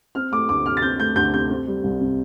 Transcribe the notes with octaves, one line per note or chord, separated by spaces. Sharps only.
C4 F6
A3 D6
D2 D6
C3 F6
A6
C4 G6
A3 G6
D2 G6
C3 G6
C4
G3
C2
C3